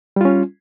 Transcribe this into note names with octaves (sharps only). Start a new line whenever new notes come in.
G3 C#4 F4